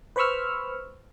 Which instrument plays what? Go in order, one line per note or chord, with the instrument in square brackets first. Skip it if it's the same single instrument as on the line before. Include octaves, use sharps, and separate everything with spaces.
[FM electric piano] B4 C5 B5 C#6 E6 F6